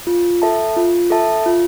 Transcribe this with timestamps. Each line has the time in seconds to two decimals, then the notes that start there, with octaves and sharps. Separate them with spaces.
0.07 F4
0.42 A4 E5 A5
0.77 F4
1.10 A4 E5 A5
1.46 F4